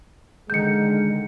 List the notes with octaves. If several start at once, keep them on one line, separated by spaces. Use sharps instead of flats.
D3 D#3 G#3 G6 C#7